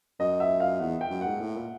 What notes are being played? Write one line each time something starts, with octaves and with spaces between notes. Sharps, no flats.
F#2 D#5
E5
F5
E2 F#5
G5
F#2
F#5
G#2
A2
A#2